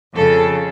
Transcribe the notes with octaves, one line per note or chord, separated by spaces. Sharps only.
F2 C#3 A4